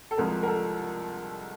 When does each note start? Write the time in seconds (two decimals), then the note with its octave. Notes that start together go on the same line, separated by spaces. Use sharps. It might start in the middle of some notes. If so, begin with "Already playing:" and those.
0.11 A4
0.18 C2 C3 F3 G#3 A#4
0.43 A#4
0.48 A4